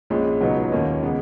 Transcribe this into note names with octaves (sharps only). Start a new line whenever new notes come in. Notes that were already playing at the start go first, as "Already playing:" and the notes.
A#1 A#2 G#3 C#4
C#2 B2 F#3 B3 D#4
D#2 D#3 A#3 C#4
C#3 G#3 B3